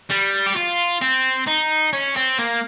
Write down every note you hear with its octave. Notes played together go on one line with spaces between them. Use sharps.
G3
G4
F4
C4
D#4
C#4
C4
A#3